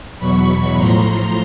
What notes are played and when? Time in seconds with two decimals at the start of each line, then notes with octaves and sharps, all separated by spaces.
0.19 E2 B2 F#3 B5 C#6
0.77 A2 F3 A#5 C6